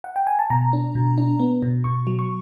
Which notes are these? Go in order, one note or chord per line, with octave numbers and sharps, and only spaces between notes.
F#5
G5
G#5
A5
B2 A#5
D4
B2
D4
B3
B2
B2 C#6
F#3
C#6